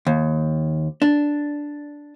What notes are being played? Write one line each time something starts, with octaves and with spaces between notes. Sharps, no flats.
D#2
D4